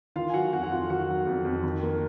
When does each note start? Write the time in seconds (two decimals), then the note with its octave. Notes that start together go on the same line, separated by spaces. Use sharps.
0.16 D#3 F4 F5
0.30 G#5
0.34 F#3 F#4 F#5
0.53 F2 F#4 F#5
0.63 F#5
0.71 F2 F4 F5
0.90 D#3 F#4 F#5
1.09 F#3
1.26 F2
1.45 F2
1.63 D#3
1.83 A#3